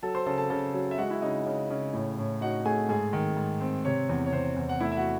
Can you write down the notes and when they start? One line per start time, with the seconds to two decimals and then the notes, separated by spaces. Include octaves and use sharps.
0.03 F#3 A4 A5
0.15 C5 C6
0.26 C#3 A4 A5
0.38 A4 A5
0.50 C#3 A4 A5
0.74 F#3
0.91 E5
0.98 G#3 F#4 F#5
1.10 E4 E5
1.22 C#3 D#4 D#5
1.46 C#3
1.70 C#3
1.94 A2
2.18 A2
2.41 D#4 F#4 F#5
2.66 A3 G#4 G#5
2.89 G#2 G#4 G#5
3.13 D#3
3.37 G#2
3.61 C4
3.85 C3 C#5
4.09 E2
4.26 C#5
4.32 C3 C5
4.56 E2
4.69 F#5
4.80 A3 E4 E5
4.92 E5
4.97 F#4 F#5